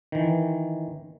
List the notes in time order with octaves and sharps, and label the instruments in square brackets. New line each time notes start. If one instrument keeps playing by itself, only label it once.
[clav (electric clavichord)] D#3 E3